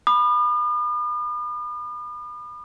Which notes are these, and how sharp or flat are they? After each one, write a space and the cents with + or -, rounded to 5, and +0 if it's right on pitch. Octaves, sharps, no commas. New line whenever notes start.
B5 -5 D#6 -45